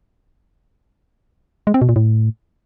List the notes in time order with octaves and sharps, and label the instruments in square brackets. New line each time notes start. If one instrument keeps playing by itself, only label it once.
[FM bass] G#3
C4
B2
A#2
A2